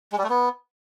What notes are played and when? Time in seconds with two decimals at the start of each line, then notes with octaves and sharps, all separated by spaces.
0.12 G#3
0.18 G3
0.24 A3
0.30 B3